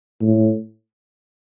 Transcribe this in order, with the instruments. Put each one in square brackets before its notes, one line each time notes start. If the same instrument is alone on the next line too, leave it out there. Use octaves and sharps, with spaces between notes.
[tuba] A2